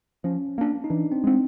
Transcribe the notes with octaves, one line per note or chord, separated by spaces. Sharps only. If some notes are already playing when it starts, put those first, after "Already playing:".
F3 C#4
A#3 D4
D#4
E3 D4
C4
G#3 C4